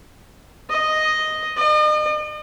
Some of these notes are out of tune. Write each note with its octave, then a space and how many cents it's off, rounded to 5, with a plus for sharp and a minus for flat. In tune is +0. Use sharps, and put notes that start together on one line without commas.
D#5 +0
D#5 -40